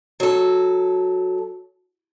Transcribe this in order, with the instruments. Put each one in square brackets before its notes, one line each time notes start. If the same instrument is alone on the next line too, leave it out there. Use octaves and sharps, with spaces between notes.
[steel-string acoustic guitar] F#3 A4